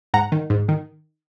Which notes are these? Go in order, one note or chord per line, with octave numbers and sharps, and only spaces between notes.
G#2 F#5 A#5
D#3
G#2
D#3